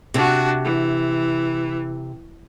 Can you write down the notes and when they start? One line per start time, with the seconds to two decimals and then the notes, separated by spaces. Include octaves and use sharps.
0.14 C3 D4 F#4
0.64 E3